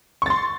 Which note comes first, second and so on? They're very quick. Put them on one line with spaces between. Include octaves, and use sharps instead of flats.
C#6 A6 C6